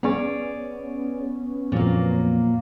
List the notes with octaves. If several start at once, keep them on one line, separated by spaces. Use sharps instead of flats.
B3 C#4 G#4 C#5 D5
F2 A#2 F3 F#3 A#3